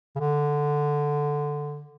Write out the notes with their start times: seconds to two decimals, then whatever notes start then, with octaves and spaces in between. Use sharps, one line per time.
0.16 C#3
0.20 D3